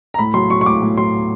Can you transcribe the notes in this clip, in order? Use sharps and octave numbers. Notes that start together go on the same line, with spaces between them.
A#5
A2 B5
F#3 C6
F#3 C#6
C#6
A2 D6
A2
F#3 C6